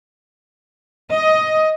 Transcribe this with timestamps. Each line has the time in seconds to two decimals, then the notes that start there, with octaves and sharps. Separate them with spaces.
1.12 D#5